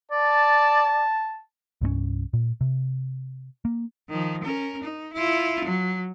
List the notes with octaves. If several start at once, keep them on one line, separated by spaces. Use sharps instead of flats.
D5 A5
C2 G2 G#3 C#4
A#2
C3
A#3
D#3 F3
C#4 A#4
D#4
E4 F4
F#3